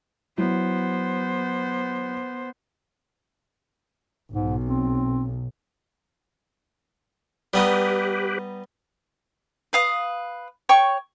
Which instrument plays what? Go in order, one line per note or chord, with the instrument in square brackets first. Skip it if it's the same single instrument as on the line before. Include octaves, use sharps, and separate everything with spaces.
[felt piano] F#3 E4 [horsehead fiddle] B3 C5
[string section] B1 [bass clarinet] G#2
[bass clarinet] C4
[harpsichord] G3 B3 D#4 [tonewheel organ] G4 B4
[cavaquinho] B4 F5 D#6
C#5 G5 C#6